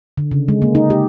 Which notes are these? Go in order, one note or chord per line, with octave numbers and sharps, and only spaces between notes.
D3
C#3
G#3
A#3
D#4
G4